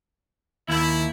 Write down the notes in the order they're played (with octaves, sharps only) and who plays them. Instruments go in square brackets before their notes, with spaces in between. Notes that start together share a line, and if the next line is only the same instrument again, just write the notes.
[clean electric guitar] D#2 [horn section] F3 A#3 E4